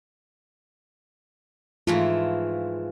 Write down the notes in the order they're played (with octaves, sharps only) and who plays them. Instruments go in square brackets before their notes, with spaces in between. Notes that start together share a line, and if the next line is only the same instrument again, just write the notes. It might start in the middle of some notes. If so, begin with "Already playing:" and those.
[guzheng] G#2 E3 A3 [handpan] F4